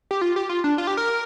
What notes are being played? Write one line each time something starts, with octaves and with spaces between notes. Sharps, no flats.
G4
F4
G4
F4
D4
F4
G4
A#4